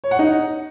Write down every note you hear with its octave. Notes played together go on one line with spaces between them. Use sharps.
C#5
F#5
D#4